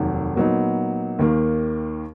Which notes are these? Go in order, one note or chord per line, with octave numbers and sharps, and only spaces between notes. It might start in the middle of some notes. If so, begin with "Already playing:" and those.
Already playing: F1 D#2 D#3 F#3
A#2 F#3 B3 D#4
D#2 D#3 A#3